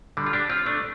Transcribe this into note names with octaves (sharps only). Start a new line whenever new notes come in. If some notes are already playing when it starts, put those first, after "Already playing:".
D3 G3
F4
D4 G4
C4 F4
A3 D4